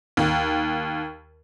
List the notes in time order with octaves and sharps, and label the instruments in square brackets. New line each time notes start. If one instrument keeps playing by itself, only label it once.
[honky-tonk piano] D#2